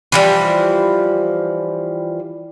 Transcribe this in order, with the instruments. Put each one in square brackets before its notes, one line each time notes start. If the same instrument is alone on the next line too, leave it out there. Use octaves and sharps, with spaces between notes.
[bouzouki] E3 F3 G3